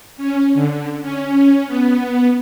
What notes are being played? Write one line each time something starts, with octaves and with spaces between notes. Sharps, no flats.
C#4
D3
C#4
B3